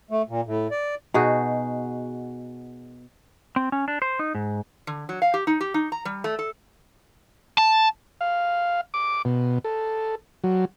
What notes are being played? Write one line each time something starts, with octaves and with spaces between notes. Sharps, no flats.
A3
A#2
A2
D5
B2 D#4 F#4 G#4
C4
C#4
D4
C5
D#4
G#2
D3
F#3
F5
G4
D#4
G4
D#4
A#5
G3
A3
A4
A5
F5
D6
B2
A4
F#3